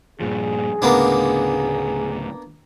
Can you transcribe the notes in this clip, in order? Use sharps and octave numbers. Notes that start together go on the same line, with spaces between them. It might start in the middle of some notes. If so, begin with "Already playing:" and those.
G2 A#2 F3 G#4
D2 A2 C#3 A#3 B3 D4